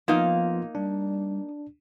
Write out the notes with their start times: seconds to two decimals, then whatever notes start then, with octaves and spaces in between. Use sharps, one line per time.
0.08 F3 A#3 B3 D#4 F4 F5
0.75 G3 D4